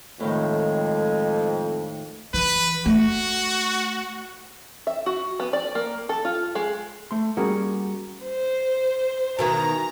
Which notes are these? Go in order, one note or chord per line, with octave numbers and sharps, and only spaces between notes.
F2 A2 D#3 G#3
E3 B4
A3 F#4
E5
F#4
B3
D5
A#3
A4
F4
G#3
A3 C6
G3 A#3 C#4 F#4 G#4 A#4
C5
B2 D#3 E3 A#5